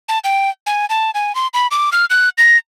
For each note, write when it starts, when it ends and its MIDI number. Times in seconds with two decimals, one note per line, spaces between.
0.09 0.19 81
0.24 0.50 79
0.67 0.86 80
0.90 1.11 81
1.15 1.35 80
1.35 1.47 84
1.54 1.67 83
1.71 1.90 86
1.92 2.05 89
2.10 2.29 90
2.38 2.57 94